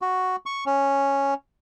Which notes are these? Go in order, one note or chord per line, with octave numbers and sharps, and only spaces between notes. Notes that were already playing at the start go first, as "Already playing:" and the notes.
F#4
C#6
C#4